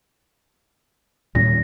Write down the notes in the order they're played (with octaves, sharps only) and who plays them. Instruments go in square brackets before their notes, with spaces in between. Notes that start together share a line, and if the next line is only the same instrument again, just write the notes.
[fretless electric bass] D#2 G3 C#4 [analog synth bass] A#2 [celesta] A#6